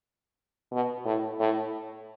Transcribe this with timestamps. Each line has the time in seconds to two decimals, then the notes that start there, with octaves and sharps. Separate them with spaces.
0.72 B2
1.05 A2
1.39 A2